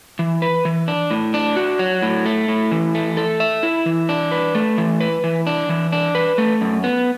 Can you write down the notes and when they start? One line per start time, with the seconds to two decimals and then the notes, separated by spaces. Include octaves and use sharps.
0.19 E3
0.42 B4
0.65 E3
0.88 D4
1.11 A2
1.34 D4
1.56 F#4
1.79 F#3
2.02 A2
2.26 A3
2.48 A2
2.71 E3
2.95 A3
3.17 A4
3.40 E5
3.63 E4
3.86 E3
4.09 D4
4.32 B4
4.55 A3
4.78 E3
5.01 B4
5.24 E3
5.47 D4
5.69 E3
5.92 D4
6.15 B4
6.38 A3
6.61 F#2
6.84 B3